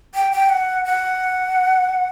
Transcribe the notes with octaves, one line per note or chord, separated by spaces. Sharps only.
G5
G5
F#5
F#5